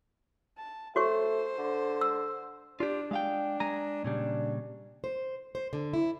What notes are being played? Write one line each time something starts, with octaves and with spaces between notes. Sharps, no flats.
A5
A3 F#4 C5 C#5 C#6
D3
E6
D4 F4 G4
G#3 F5 G5
G#3 G#5 A#5
A#2 C#3 G3 D4
C5
C5
D3
E4